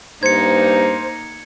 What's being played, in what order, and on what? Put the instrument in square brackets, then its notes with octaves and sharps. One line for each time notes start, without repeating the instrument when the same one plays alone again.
[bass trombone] G2 [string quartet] A#3 D#4 [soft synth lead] C5 [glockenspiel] G#6 C#7